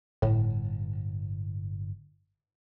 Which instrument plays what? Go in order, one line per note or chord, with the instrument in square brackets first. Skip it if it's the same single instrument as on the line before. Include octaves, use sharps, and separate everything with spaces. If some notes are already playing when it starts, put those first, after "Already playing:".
[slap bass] G1 [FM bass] A2